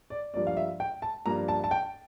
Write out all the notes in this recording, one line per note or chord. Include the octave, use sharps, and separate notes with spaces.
D5
G2 F3 A#3 D4 D5
F5
E5
G5
A5
G2 F3 A#3 D4 A#5
A5
A5
G5